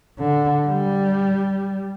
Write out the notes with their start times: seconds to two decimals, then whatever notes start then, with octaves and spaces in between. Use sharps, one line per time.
0.18 D3
0.68 G3